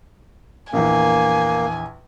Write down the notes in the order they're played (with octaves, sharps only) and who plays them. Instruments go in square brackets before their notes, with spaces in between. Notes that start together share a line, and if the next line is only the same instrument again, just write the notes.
[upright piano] A#1 E2 [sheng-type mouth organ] A#3 [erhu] G#5